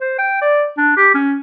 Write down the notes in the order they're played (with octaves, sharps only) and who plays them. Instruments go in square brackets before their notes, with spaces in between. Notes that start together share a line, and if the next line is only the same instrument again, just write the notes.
[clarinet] C5
G5
D5
D4
G4
C#4